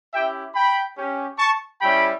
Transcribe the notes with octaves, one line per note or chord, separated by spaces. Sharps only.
C#4 E4 G4 E5 G5
G5 B5
C#4 G4
A5 C#6
G3 C#4 E4 G4 G5 B5